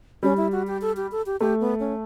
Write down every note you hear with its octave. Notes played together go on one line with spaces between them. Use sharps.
G3 C#4
E4
F#4
G4
A4
G4
A4
G4
A3 G4
B3
C#4